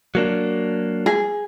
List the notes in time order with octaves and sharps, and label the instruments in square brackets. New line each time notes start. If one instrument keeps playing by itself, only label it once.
[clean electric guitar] F#3 A#3 D4
[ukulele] G#4